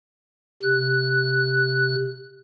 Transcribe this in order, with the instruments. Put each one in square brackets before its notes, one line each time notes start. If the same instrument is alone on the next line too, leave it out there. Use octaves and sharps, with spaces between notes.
[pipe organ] C3 F#6